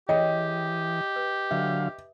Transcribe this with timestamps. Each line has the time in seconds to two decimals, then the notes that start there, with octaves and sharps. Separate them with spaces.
0.09 E3 G4 G#4 C#5 D#5 G5
1.16 B4
1.51 D3 F#3 E5 F5